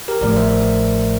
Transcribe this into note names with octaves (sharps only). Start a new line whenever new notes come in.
G4 A#4
A1 A2 F3 A3 A#4 D5
C5 E5